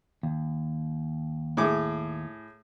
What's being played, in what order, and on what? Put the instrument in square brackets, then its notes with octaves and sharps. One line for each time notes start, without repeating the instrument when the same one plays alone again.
[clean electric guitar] D#2
[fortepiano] A2 G#4 D6